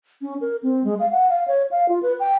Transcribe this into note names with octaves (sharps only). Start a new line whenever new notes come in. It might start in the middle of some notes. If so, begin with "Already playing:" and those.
C#4
A#4
C4
G#3
F5
F#5
F5
C#5
F5
F4
B4
G5